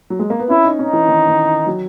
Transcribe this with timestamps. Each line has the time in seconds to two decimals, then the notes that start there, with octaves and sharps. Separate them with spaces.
0.10 F#3
0.19 G#3
0.30 A#3
0.39 B3
0.49 C#4 E4
0.65 D#4
0.79 C#4 D#4
0.93 E3
1.08 D#3
1.28 D#3
1.67 F#3